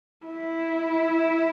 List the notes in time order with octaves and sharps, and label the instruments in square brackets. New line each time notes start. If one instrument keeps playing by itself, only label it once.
[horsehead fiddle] E4